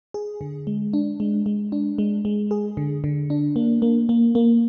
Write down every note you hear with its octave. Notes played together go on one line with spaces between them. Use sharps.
G#4
D3
G#3
D4
G#3
G#3
D4
G#3
G#3
G#4
D3
D3
D4
A#3
A#3
A#3
A#3